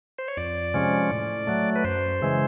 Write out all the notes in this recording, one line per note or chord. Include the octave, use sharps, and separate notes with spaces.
C5
C#5
F2 D5
C3 F3 G#3 C#4
A2
F#3 A3
B4
F#2 C5
C#3 E3 G#3